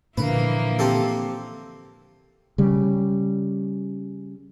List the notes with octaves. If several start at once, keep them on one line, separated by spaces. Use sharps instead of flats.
A#2 D3 E3 F3 A#3 B4
C4 G4 A4
C#3 G3